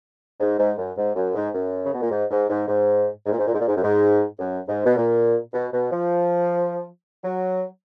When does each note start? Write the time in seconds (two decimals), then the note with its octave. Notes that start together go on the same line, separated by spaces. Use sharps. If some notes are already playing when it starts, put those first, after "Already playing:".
0.40 G#2
0.58 G#2
0.78 F#2
0.97 G#2
1.16 F#2
1.35 G#2
1.54 F#2
1.84 C#3
1.93 B2
2.02 A#2
2.11 G#2
2.31 G#2
2.49 G#2
2.68 G#2
3.25 G#2
3.32 A#2
3.39 G#2
3.47 A#2
3.54 G#2
3.60 A#2
3.68 G#2
3.76 F#2
3.83 G#2
4.39 F#2
4.68 G#2
4.85 B2
4.96 A#2
5.53 B2
5.73 B2
5.91 F3
7.24 F#3